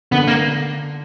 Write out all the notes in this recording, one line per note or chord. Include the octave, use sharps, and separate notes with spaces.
D3 B3
A#3